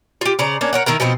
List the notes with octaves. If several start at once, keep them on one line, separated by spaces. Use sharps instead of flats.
F4 G4
C#3 C5 D5 A#5
A#3 C#4 D4
A#4 C#5 F#5
D#3 E4 A#4 A#5
B2 F3 C4 D#4